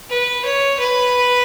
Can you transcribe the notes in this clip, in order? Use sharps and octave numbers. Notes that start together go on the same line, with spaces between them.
B4
C#5
B4